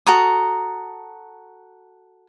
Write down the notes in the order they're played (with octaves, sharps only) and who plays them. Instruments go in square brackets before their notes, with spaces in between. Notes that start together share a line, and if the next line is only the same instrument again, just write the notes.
[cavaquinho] F#4 A4 A#5 D#6